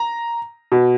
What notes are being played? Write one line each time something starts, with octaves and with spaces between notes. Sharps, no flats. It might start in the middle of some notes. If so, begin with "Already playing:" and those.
Already playing: A#5
B2